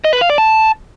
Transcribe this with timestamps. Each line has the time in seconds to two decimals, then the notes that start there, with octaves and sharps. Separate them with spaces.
0.05 D#5
0.13 B4
0.21 F5
0.30 D5
0.38 A5